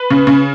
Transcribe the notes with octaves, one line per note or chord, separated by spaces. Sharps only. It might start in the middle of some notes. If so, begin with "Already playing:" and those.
Already playing: B4
C#3
C#3